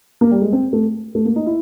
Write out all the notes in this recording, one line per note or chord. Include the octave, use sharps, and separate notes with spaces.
A#3
G3
G#3
C4
A3
A3
A#3
D#4
E4